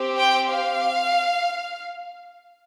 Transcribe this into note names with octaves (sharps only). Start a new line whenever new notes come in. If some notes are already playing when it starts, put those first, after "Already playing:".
Already playing: C4 G4
G5
F5